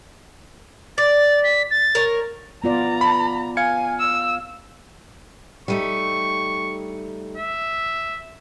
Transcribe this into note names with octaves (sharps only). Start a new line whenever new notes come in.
D5 A6
B6
A6
A#4 C#5
B3 F4 D5 A#5
B5
F5 G#5 G#6 C#7
E6
G3 A3 D#4 C#6
E5